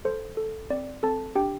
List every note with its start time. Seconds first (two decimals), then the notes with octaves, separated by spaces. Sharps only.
0.05 A4 C5
0.37 A4
0.70 C4 D5
1.03 C4 A4 A5
1.36 D4 G4 G5